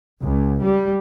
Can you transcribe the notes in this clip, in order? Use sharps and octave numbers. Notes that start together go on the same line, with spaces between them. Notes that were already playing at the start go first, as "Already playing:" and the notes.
C#2
G3